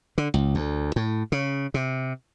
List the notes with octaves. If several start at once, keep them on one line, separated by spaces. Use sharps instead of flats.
D3
C#2
D2
A2
C#3
C3